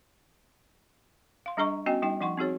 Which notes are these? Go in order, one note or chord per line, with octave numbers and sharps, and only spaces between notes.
F5 C6
G3 D4 G#4 D#5 A#5 C#6
B3 C#4 F#4 D#5 G5 G#5
G3 D#4 G5
F3 D#4 F#5 C6 C#6
C4 D#4 F#4 G#4 C#5